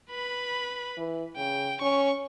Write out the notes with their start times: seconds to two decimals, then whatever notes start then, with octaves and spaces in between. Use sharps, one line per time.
0.10 B4 B5
0.97 E3
1.37 C#3 G5
1.81 C#4 C#6